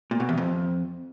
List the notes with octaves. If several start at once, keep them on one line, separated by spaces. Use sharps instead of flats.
A#2
B2
E2
F2